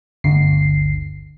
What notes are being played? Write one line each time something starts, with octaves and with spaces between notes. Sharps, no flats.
G1 D2 D3 C7